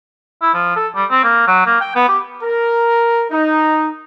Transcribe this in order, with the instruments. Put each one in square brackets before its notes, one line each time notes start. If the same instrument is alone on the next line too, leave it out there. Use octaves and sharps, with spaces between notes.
[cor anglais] E4
F3
A4
G3
C4
A#3
F#3
A#3
G5
B3
G4
[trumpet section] A#4
D#4